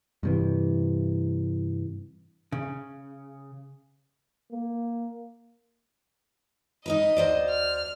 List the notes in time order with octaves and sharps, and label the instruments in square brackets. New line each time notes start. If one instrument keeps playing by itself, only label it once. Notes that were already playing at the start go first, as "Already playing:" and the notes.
[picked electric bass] G2 C3 E3
[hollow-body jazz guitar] C#3
[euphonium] A#3
[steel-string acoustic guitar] D#4 A#4 B4 [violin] D#5
[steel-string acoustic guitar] D2 C5 D5
[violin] F6